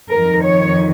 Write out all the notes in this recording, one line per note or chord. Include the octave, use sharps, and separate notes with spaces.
F2 D#3 A#4
C#5